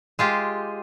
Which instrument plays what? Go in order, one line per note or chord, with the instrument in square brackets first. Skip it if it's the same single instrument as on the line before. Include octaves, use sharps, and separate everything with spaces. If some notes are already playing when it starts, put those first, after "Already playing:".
[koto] G#3 F4 G4